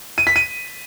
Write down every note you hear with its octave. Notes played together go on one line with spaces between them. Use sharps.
D#7
B6
D#7